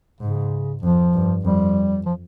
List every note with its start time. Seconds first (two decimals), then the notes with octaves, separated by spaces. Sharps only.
0.21 G#2 C#3
0.83 F2 F3
1.13 G2
1.44 F2 G3
2.06 F3